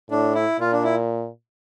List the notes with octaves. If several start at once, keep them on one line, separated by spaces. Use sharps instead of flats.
A2 D4
E4
A#2 F4
D4
E4